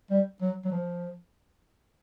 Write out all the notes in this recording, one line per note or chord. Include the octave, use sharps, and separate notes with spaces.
G3
F#3
F#3
F3